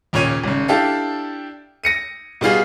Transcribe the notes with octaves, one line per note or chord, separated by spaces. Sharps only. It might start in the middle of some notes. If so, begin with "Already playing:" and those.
D#2 A#2 C#3 C#5 D#7
G#1 C#3
D4 E4 G4 A4 F5
A#6 C#7 D#7
B2 G3 F4 G#4